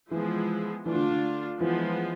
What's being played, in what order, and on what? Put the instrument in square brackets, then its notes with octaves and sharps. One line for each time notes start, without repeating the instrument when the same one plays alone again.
[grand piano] E3 [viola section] F3 G#3 B3 E4 G#4
[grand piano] E3 [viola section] A3 D4 F4
[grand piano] D3
D3
[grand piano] E3 [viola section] F3 G#3 B3